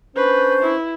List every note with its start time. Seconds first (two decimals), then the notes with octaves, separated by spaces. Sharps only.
0.17 C#4 D4 B4 C5
0.63 E4